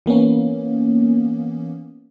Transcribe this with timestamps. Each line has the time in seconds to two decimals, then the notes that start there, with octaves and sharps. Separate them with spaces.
0.06 E3 A#3 B3 C#4